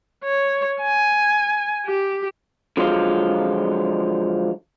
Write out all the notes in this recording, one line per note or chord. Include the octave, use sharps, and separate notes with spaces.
C#5
G#5
G4
D3 F3 F#3 G#3 F4